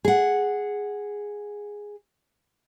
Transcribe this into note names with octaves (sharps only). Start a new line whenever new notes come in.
G#4 F#5